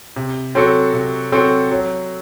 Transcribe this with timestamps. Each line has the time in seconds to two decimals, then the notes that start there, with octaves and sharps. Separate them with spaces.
0.16 C3
0.55 F#3 C4 F#4 A4
0.94 C3
1.32 F#3 C4 F#4 A4
1.71 F#3